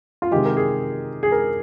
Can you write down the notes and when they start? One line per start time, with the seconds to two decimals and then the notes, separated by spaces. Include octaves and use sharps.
0.22 F4
0.31 C3 D#3 G#3 G4
0.45 A#4
0.57 G#4
1.23 G#4
1.32 A#4